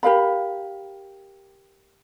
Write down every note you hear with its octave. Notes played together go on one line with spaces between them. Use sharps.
G4 A#4 F5 B5